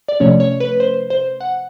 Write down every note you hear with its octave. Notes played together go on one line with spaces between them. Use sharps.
D5
C3 F3 A3 C#4 C#5
C#5
B4
C5
C5
F#5